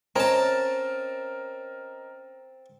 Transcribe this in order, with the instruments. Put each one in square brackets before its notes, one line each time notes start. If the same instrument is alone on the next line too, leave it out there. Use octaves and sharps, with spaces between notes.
[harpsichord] C4 A5 [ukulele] C#4 A#5 [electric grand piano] A#4 D#5